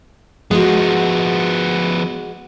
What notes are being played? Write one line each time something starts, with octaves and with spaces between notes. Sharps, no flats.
F3 G#3 B3 F#4